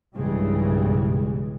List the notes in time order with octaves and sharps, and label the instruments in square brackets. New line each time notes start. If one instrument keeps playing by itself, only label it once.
[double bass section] B1 G2 C#3 E3 G3 G#3